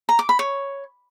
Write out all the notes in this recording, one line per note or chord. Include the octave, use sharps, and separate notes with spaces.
A#5
D6
B5
C#5